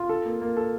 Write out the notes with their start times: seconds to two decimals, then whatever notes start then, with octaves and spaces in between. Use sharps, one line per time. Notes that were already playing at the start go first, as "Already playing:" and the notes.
Already playing: F4
0.09 A4
0.25 A#3
0.41 A#3
0.57 A4